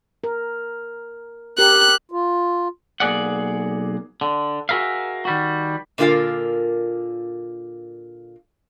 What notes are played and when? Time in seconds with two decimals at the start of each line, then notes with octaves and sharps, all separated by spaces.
0.24 A#4
1.58 G4 A#4 F#6
2.11 F4
3.00 B1 A#3 G#4 D5 F#5
4.21 D3
4.69 F#4 G#4 A#4 E5 F5
5.25 D#3 G3 F#4
5.98 A#2 D3 A#3 F4 A#4 F5